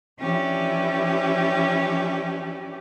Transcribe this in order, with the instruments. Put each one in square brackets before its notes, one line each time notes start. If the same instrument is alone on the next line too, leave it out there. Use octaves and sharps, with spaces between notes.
[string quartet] E3 F3 C#4 D4 E4 G4